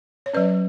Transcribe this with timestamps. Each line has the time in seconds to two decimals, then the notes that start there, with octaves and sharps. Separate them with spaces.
0.26 C#5
0.33 F#3 C#4 B4 D5